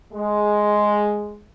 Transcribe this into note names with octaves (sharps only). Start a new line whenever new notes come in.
G#3